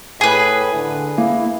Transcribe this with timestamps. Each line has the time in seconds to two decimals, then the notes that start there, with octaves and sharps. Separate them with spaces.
0.21 A2 G#4 B4 G#5
0.75 D3
1.18 A#3 E4